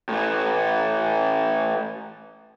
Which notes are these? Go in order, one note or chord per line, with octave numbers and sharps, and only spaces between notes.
A2 E3